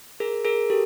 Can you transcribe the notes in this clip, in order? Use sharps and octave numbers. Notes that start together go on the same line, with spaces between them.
G#4 A#4
G#4 A#4
G4 A4